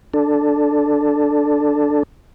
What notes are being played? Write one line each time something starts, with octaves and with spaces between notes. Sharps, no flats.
D4 A4